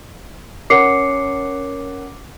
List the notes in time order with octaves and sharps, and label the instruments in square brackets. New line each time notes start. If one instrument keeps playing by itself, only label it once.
[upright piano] C#4 A#4 F#5 [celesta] D6 C7 C#7